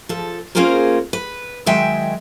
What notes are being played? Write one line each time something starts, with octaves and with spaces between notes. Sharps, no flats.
F3 A4
A#3 C#4 F4 G#4 A#4 C5
B4
D#3 F#3 G#3 E5 G5 G#5